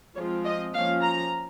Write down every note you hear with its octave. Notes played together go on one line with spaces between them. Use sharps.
F3 G#3 C4 F4 C#5
D#5
F3 A#3 C#4 F4 F5
A#5